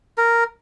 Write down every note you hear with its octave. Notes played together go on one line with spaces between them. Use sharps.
A#4